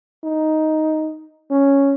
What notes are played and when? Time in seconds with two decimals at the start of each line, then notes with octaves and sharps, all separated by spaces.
0.24 D#4
1.51 C#4